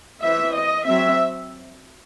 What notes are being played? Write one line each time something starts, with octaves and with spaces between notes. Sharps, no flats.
E3 C4 E5
D#5
F#3 C4 E5